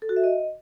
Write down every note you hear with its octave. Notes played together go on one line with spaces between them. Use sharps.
A4
F#4
E5
D#5